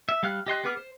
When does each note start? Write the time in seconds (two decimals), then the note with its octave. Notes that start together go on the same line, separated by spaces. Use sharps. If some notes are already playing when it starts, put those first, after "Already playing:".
0.09 E5
0.23 G3 F5 F6 F#6
0.47 G4 D#5 C6 F#6
0.64 B3 G#4 B4 D6 F6
0.77 C5